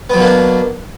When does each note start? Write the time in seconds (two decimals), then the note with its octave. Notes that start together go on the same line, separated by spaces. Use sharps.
0.10 B3
0.13 F#3
0.17 B2
0.21 A#3
0.24 D4